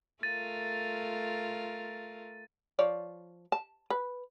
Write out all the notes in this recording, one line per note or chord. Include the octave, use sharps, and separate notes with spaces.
A3 F4 A#4 A6 D#7
F3 C#5 D5
A5
B4